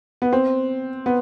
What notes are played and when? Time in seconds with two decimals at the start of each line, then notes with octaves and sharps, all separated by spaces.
0.22 B3
0.33 C4
1.06 B3